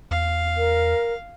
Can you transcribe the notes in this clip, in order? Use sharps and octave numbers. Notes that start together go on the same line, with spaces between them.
E2 F5
A#4